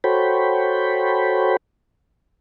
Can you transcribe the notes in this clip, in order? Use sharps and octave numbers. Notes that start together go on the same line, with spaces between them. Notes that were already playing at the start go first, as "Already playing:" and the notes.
F#4 A4 C5 C#5 G5 B5